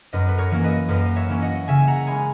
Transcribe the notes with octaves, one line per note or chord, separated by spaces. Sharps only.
F#2 B4 D#5
B4
A#4 C#5
E3 A#3 C#4
B4 D#5
F#2 B4 D#5
C#5 E5
E3 A#3 C#4
D#5 F#5
C#3 E5 G#5
F#5 A#5
G#3 C#4 G#5 B5